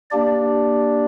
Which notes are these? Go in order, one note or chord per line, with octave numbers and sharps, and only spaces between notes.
A#3 D4 G4 D5